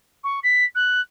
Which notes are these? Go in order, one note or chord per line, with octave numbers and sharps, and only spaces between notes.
C#6
B6
F#6